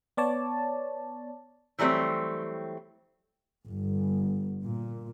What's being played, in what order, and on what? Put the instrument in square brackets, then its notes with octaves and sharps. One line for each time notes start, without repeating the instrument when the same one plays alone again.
[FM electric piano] B3 C#5 D5 A5
[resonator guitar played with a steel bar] E3 F#3 G3 A3 C4
[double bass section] G1
A#2